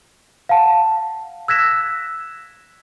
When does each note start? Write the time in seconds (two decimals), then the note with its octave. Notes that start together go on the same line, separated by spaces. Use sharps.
0.49 F5 F#5 A5
1.48 E6 F#6 G#6 A#6 B6 E7